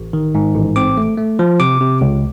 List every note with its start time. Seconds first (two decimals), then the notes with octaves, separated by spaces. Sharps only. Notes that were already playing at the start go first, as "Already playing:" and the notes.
Already playing: A1
0.13 D#3
0.35 G#2
0.55 A1
0.76 C4 D6
0.97 A3
1.17 A3
1.39 F3
1.60 C3 D6
1.81 C3
2.01 C#2